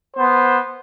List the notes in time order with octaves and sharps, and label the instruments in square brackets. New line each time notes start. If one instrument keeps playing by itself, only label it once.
[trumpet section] B3 C5